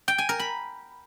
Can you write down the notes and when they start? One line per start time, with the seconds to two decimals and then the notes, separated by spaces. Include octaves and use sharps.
0.08 G5
0.18 G#5
0.29 A#4
0.39 B5